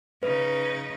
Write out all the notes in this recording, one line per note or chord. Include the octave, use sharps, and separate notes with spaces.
C#3 D#4 B4